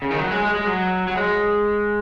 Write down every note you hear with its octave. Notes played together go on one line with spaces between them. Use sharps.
C#3
D#3
F#3
G#3
G#3
G#3
F#3
F#3
G#3